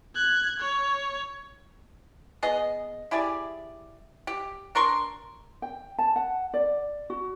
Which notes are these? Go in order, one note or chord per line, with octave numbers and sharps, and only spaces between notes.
F#6 G#6
C#5
B3 G#4 D#5
E4 G4 G#4 D5
G4
D4 A#4 C6 C#6
G5
A5
F#5
D5
F#4